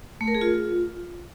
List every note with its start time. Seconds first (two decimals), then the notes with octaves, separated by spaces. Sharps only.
0.21 A3
0.28 A#4
0.35 G#4
0.41 F4